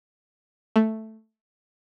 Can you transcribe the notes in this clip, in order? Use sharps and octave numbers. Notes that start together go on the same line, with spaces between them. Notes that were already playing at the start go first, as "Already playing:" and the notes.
A3